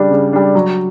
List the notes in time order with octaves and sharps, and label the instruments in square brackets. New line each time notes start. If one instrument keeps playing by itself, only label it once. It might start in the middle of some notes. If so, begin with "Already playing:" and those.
Already playing: [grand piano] C#3 G3 D4
C#3
G3 D4
F#3